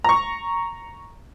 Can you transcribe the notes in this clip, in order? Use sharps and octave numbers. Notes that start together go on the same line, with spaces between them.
A#5 C#6